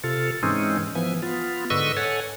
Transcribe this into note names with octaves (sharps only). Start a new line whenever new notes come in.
C3 F4 A4
G#2 E3 G#3 C4 C#4 D#4
E3 F3 B3 G#5
B3 F4
G#2 D3 B4 D#5 C#6 E6
A4 C#5 F#5 G#5